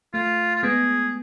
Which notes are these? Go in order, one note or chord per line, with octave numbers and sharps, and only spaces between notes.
A3 F4
F4
G#3 B3 G#4